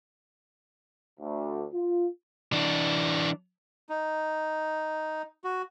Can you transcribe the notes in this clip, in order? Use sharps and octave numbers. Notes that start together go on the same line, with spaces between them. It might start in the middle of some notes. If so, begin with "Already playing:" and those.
D2
F4
E3 D4
D#4
F#4